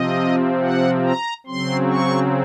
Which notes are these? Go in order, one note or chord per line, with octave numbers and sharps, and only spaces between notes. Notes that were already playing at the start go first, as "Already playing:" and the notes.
Already playing: C3 F3 C4 D#5
F#5
A#5
C#3 F#3 C4 C6
C#6